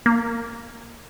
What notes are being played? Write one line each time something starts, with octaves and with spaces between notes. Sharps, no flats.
A#3